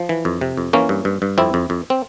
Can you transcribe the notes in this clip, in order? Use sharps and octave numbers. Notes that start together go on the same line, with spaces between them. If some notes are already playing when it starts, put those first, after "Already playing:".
Already playing: F3
E3
F2
C3
F2
E3 A#3 C#4
G2
G2
G2
F2 C4 E4
F2
F2
C4